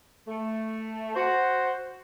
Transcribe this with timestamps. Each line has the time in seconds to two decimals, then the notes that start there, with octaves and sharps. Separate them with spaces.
0.28 A3
1.14 F#4 C5